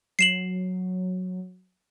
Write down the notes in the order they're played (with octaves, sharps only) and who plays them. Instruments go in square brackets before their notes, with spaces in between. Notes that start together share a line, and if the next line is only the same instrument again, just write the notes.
[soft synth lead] F#3 [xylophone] C7 E7 F#7